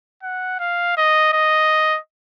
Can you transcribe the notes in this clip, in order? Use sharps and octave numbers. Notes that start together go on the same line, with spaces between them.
F#5
F5
D#5
D#5